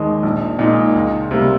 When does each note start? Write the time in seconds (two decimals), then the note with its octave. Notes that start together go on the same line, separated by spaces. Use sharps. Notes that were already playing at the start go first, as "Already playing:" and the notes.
Already playing: D#2 D#3 G#3
0.23 A#1
0.59 A#2 G#3 D#4
0.94 C#2
1.31 C3 G3 A#3